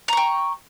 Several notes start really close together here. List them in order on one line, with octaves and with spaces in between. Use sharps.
A#5 C#6 G5